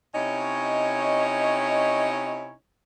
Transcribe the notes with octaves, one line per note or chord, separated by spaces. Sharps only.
C3 C#4 D#4 E4 C#5 D#5